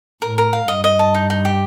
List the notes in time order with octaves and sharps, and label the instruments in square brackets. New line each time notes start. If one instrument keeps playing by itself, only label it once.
[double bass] A2 [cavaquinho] A#4
[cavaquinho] A#4
F5
[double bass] G2 [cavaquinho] D#5
[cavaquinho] D#5
A5
D#4
D#4
G4